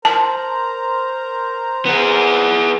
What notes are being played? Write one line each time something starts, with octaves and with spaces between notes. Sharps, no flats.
A#4 C5 A5 A#5
B3 G#4